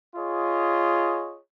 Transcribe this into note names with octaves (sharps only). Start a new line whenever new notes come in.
F4 G#4 C#5 D#5